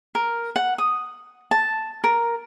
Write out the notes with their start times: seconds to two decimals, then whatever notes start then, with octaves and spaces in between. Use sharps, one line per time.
0.15 A#4
0.56 F#5
0.78 D#6
1.51 A5
2.04 A#4